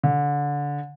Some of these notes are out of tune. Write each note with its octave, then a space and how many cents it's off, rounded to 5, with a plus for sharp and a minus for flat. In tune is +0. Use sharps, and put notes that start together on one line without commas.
D3 -25